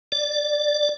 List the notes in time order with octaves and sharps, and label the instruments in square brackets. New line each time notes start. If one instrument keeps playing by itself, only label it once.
[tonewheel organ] D5